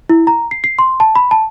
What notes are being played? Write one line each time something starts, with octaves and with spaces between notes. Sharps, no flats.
E4
A#5
C7
C7
C6
A5
B5
A5